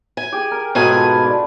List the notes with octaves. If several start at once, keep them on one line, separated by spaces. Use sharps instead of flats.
G#5
G4 G#4
A#4
G#2 B2 A3 G#5
F4 B4
D4 F4